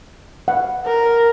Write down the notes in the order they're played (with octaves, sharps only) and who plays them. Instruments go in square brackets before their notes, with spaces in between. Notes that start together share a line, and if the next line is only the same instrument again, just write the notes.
[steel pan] F#5
[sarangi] A#4